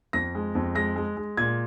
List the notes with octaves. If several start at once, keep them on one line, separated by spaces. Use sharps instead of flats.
F2 A#6
G#3
F2
G#3 A#6
G#3
G#3
A#2 G#6